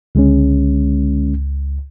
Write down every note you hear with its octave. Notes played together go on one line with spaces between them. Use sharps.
C#2 D3 G#3 C#4